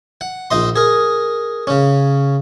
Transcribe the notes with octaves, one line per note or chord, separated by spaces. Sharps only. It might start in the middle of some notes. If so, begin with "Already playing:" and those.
F#5
A#1 D#4 D#5 C6
G#4 A#4
C#3 C#4